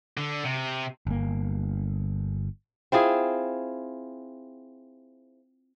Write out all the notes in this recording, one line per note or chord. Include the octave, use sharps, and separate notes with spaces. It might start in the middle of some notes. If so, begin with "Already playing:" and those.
D3
C3
G1 A#3
C4 E4 F4 G#4